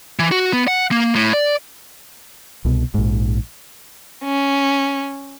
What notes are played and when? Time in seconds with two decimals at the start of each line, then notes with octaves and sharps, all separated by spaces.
0.19 E3
0.31 F#4
0.53 B3
0.68 F#5
0.91 A#3
1.15 A2
1.33 D5
2.65 C2 B2
2.94 A#1 G#2
4.24 C#4